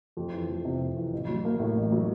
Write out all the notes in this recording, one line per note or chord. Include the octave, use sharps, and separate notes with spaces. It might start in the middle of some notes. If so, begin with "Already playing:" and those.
F2
E3
F2
C3
F2
E3
A1
F#3
A#3
A2
A1
F#3